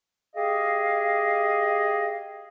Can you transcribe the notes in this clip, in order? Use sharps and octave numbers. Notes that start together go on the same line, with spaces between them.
G4 G#4 D#5 F5